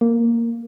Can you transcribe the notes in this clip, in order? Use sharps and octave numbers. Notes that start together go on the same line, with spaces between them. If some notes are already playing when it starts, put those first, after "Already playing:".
A#3